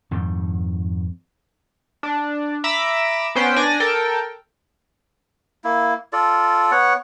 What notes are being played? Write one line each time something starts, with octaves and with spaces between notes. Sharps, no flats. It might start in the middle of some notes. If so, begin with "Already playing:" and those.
F2 G#2 D#3
D4
E5 A#5 B5 D6 E6
B3 C#4 C5 G5 C6
D4 D5 G#5 A#6
A4 A#4 G5
A#3 E4
F4 A4 D5
B3 C#5 F#5